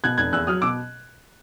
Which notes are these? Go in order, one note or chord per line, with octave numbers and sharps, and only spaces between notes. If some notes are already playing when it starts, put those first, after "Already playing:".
B2 F#6 G#6
F1 F#6 G#6
E2 E6 F#6
F#3 D#6 F6
B2 D6 E6